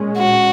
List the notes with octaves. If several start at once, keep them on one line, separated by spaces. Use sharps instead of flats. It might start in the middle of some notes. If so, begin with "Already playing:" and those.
Already playing: A#2 G#3 C#4
F#4